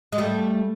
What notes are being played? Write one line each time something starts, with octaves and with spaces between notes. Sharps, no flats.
G#3
G3 A3